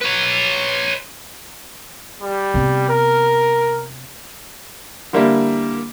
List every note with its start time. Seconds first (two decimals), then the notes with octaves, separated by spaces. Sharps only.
0.02 B4 C#5
2.21 G3
2.54 C3 B3
2.89 A#4
5.13 D3 G3 A#3 E4